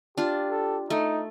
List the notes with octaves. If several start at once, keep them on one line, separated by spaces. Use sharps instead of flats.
D4 F4 G4
A4
A3 D#4